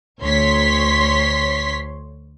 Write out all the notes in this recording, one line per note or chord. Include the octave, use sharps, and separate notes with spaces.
D2 C#5 C6 B6